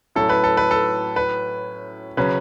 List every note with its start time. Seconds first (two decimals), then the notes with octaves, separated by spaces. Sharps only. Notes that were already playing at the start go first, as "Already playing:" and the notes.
0.15 A2 F#3 C#4 E4 A4
0.29 B4
0.44 A4
0.57 B4
0.71 A4
1.16 B4
2.17 C#3 F#3 C#4 B4